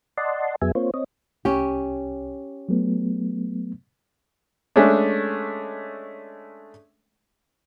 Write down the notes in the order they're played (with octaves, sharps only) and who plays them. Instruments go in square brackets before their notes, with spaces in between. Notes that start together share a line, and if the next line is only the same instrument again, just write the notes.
[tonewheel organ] D5 D#5 F#5 A5 C6
F2 F#3 B3 G#4 E5 G#5
A#3 C4 F4 C5 C#5
C4 C#5 D#5
[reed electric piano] C2 [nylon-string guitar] C#4 G4
[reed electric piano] F#3 A3 B3
[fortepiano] G#3 A3 C#4 D4